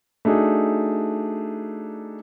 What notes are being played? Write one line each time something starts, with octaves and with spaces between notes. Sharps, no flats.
A3 D4 D#4 F#4 G#4